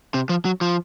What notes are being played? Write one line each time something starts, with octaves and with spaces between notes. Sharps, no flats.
C3
F3
F#3
F3